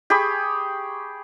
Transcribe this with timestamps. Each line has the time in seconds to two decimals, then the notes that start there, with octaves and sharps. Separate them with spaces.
0.10 G4 G#4 B5 C#6